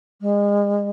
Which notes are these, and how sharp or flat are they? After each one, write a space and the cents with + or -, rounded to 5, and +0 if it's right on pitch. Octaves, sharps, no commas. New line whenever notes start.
G#3 -35